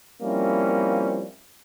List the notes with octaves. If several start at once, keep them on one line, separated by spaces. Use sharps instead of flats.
F3 G3 A#3 C4 C#4 E4